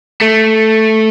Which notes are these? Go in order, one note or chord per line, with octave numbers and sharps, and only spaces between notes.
A3